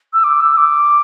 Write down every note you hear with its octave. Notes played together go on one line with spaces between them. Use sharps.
E6
D6
E6
D6